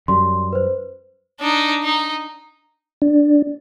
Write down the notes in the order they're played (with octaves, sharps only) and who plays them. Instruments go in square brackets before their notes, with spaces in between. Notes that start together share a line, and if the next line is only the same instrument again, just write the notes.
[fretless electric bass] F#2 G3 [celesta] C6
[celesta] B4 C5
[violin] D4 D#4
D#4
[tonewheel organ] D4